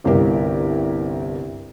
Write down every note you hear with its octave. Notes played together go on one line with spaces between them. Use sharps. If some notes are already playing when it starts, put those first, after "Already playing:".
G1 C2 G3 G4 A#4